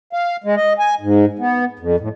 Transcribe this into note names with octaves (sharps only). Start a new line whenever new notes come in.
F5
G#3
D#5
G#5
G#2
B3
F2
A2